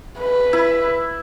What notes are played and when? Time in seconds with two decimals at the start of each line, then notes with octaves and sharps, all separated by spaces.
0.19 B4
0.53 E4